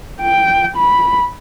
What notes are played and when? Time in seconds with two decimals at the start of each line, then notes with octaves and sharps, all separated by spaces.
0.22 G5
0.77 B5